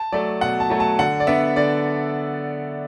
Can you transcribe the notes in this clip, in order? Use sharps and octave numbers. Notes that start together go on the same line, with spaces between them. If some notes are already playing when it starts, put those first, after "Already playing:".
Already playing: A5
F#3 A3 D5
B2 F#5
A5
F#3 A3
A5
D3 F#5
D5
B3 D4 E5
D3 D5